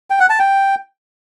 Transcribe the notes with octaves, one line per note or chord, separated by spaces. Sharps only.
G5
F#5
A5
G5